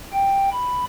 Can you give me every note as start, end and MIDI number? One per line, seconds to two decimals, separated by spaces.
0.13 0.49 79
0.52 0.85 83